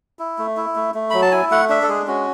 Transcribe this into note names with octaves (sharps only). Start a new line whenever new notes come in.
E4
A3
E4
A3
A3
F#3 B5
A5
E4 G#5
A3 F#5
D4 E5
A4
G#3 G#4
C#4 F#4